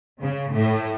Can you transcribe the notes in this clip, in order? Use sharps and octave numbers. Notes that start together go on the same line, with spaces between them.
C#3
A2